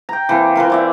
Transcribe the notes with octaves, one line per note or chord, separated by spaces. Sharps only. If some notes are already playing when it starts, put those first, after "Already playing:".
G5 A#5
E3 A#3 C4
E3 F4 A#4 F5
C5 D5 E5